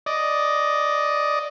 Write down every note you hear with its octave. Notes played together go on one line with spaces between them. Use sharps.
D5 D#5